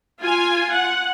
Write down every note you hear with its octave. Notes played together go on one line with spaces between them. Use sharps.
F4 G#5
F#5